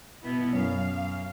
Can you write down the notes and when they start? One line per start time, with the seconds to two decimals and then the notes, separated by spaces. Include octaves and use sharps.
0.22 B2 B3 E4
0.53 F#2 F5